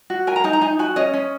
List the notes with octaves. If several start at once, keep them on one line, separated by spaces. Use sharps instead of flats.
F#4
A#4 G#5
A#5
D#4 G#5
A#5
D#4 G#5
F#4 G#5
C#4 D#5
C#4